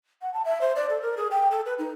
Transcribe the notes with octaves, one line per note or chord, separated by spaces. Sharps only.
F#5
A5
E5
C5
D5
A4
A#4
G#4
G5
A4
B4
D#4